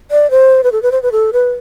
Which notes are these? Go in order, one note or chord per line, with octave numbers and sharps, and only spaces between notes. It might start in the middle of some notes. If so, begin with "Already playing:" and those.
D5
C5
B4
A4
B4
C5
B4
A4
B4